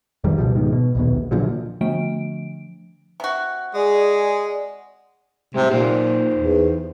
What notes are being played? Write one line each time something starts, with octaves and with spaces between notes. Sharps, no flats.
G1 F2 D#3 G3
C#2 B2 F3 G3
G#2 B2 D#3
B2
A#1 D#2 B2
A#2 D3 F3 F#3
D3 F3 A3 D7
C3 F#4
G#3 G#4 D5
A2 C3 G3 G#3
A#2 D#4 G4 C5
E2